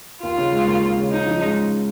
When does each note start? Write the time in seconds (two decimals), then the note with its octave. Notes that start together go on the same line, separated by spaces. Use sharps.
0.23 D#2 F4
0.38 C#3
0.52 G#3
0.67 D#2
0.83 D#2
0.98 C#3
1.12 C#4 D#4
1.27 F3
1.42 G#3